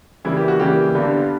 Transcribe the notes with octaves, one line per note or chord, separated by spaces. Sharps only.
C#3 E3 G3 A#3 E4
G4
F#4
C#3 E3 G3 A#3 G4
G2 D3 G3 B3